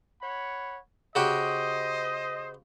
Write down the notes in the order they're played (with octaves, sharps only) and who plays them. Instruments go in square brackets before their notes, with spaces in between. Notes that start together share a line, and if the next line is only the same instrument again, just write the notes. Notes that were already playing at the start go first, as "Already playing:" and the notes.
[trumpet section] C#5 F#5 B5
[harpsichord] C#3 F#4 G4 [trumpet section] C5 D#5